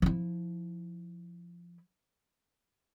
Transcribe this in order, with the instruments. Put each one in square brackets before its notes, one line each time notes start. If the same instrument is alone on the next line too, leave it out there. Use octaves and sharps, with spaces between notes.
[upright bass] F3 E4